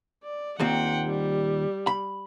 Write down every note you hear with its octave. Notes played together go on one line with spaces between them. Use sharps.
D5
D#2 A#2 C4 F#5 G5
G3
B5